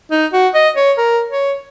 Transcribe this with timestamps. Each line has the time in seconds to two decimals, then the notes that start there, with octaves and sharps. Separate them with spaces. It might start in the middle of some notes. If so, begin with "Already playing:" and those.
0.11 D#4
0.33 F#4
0.54 D#5
0.76 C#5
0.98 A#4
1.30 C#5